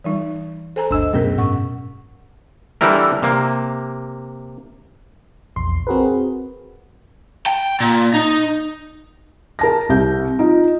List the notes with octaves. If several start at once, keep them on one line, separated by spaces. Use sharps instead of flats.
E3 G3 D#4
A4 C5 G#5 A#5
G1 D2 D4 D#5 E6
F#2 B2 A3 C#4 G#4 A#4 E6 B6
G#2 F#5 C#6
D3 E3 G3 E4 A#4
C3 A#3
A#1 E2 C6
C4 F#4 G#4 A#4 B4
G5
A#2
D#4
A#4 A5 A#6
C2 G6
D#4 F4